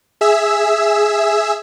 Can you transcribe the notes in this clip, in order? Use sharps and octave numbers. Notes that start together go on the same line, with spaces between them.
G#4 E5 E6